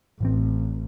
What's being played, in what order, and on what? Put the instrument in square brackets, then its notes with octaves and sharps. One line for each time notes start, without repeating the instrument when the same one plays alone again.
[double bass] A1 [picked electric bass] A2 E3 C4